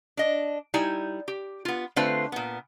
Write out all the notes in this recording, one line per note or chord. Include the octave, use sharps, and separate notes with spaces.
D4 D#5
G3 D#4 E4 G#5
G4
B3 F4
D3 A3 C4 F4 B4 C5
A#2 B3